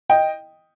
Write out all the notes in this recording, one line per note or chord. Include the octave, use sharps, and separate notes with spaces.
D#5 G5